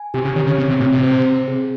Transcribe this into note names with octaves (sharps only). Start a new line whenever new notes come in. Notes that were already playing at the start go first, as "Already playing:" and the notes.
Already playing: G#5
C3 G4
C#3
D#3 C#5
C#3
C#3 C4
C3
A#2 C4
C3
C5
C4
G#4